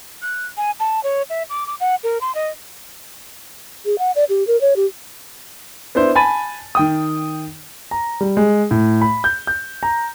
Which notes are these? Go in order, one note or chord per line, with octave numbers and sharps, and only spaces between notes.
F#6
G#5
A5
C#5
E5
D6
D6
F#5
A#4
C6
D#5
G#4
F#5
D5
G4
A#4
C#5
G4
B3 D4 E4 C5
G#5 A5 B5 A6 D#7
D#3 G5 D#6
A#5
G3
G#3
A2
B5
G6
G6
A#5